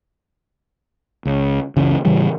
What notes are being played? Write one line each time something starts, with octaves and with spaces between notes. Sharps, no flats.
C#2
F#1 C#2 C#3 E3
A2 C#3 E3 G3